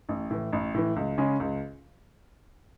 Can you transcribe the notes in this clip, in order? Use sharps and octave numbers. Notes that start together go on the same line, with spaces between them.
A1
A2 E3
A1
A2 E3
C#2
C#3 G#3 C#4
C#2